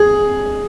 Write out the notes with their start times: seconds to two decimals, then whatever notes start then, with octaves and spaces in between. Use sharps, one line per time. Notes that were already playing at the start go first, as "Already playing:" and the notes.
Already playing: G#4